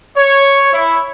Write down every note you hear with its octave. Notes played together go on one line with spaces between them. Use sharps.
C#5
E4